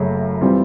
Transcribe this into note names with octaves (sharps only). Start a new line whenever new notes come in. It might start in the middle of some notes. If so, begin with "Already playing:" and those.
Already playing: F#1 F#2 C#3 F#3 A3
E3 G3 C4 F4